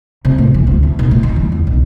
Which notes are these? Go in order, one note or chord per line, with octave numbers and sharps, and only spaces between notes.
C3
A2
E3
D2
A3
B1
A2
D#3
E3
E2
B1